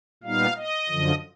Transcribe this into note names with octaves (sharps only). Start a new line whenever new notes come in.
A#2 G3 B3 D#4 F5
D#5
F#2 D3 F3